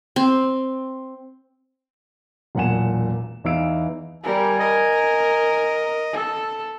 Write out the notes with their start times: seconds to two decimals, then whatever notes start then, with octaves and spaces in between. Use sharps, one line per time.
0.16 C4
2.55 E1 B1 A#2 F#5 G#5 E7
3.44 E2 E3 D#4 F5 E6 D7
4.23 G3 A#4 G#5
4.59 A#4 D#5
6.13 A4